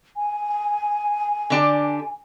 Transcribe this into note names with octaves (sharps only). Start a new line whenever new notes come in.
G#5
D3 D4 G4